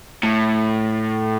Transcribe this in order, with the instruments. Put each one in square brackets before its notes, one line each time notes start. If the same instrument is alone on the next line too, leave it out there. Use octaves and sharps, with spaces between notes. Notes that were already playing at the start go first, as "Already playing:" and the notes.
[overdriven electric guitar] A2